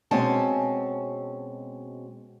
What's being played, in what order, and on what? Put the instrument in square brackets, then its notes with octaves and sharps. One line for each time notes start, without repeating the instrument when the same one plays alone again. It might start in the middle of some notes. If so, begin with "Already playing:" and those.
[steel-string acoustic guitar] B2 G#3 C4 C#4 G#5 A5